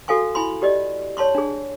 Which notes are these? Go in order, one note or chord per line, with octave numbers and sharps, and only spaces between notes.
F#4 A4 F5 G#5 C#6
E4 G#5 B5 C6
G4 D5 D#5
C#5 A5 C6 C#6
D4 G#4